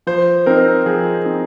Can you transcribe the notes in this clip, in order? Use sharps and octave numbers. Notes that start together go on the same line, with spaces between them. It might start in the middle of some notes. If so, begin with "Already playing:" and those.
F3 C5
C4 D#4 A#4
F3 G#4
C4 D#4